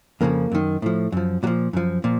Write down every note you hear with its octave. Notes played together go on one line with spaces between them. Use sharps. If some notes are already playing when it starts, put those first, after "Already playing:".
F2 C#3 F3 A#3
F#2 D#3
A2 F3
F#2 F3
A#2 F3 F#3
F#2 F3
A#2 F3